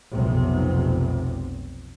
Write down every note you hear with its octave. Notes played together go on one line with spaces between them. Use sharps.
F1 B1 C3